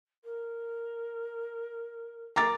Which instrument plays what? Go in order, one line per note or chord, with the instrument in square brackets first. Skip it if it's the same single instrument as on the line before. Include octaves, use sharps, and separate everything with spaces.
[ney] A#4
[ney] A#4 [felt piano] A#5 D6 A6